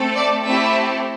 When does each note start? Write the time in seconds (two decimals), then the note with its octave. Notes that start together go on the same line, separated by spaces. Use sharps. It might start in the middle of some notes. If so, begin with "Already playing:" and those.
Already playing: A3 C4 A4
0.15 D5
0.47 A3 C4 E4 G4 E5